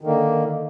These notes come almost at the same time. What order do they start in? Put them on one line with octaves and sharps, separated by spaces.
D#3 D3 A#3